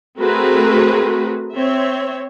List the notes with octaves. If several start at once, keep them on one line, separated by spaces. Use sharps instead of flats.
A3 C4 F#4 G#4 A#4 B4
C4 C#5 E5